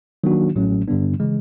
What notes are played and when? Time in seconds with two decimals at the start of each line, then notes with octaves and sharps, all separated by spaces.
0.24 D#3 F#3 A#3 D4 F#4
0.55 A1 A2 F#3 A3 C#4
0.88 G2 D3 G3 B3 D4
1.20 C#3 E3 G#3